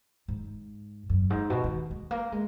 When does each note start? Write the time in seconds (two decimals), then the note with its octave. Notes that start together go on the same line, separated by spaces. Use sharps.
0.28 G#2
1.09 F#2
1.30 G#2
1.50 B2
1.64 D#3
1.91 G#3
2.11 A#3
2.32 G#3